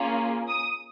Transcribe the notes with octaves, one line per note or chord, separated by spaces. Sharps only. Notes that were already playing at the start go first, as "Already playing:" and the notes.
Already playing: A#3 C#4 F4 G#4
D#6